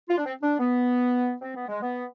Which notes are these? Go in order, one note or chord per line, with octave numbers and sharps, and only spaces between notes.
F4
D4
C4
D4
B3
C4
B3
G#3
B3